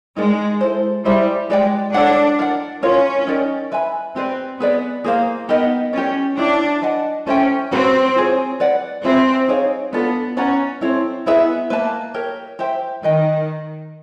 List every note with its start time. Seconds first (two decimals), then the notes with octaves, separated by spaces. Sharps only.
0.16 G#3 D#4 G4 A#4 D5
0.61 E4 A4 C5
1.05 G3 E4 G#4 C5 E5
1.50 G#3 G4 B4 D5 G5
1.94 D4 A4 C#5 F#5
2.39 A#4 D5 F#5
2.83 C#4 F4 A#4 C#5 F5
3.27 D#4 G4 A#4 D5
3.72 B4 E5 G#5 B5
4.16 C4 G4 B4 D5
4.60 B3 G#4 B4 D5
5.04 A#3 G#4 C5 F5
5.49 B3 D#4 G4 A#4 D#5
5.93 C#4 G4 A#4 D5
6.37 C#4 D4 E4 G4
6.82 B4 D#5 F#5 A5
7.26 C#4 A4 C5 E5 G5
7.71 C4 C#4 F#4 B4
8.15 F4 G#4 C#5
8.60 B4 D5 F#5
9.04 C4 F4 G#4 B4 E5
9.48 D#4 G#4 C#5 F5
9.92 B3 D4 F4 A4
10.37 C#4 B4 D5 F#5 A#5
10.81 C4 E4 A4 C#5
11.26 B3 E4 G#4 B4 E5
11.70 A#3 B4 E5 A5
12.14 G4 A#4 C#5
12.59 G4 C5 E5 G5
13.03 D#3 B4 D#5 G5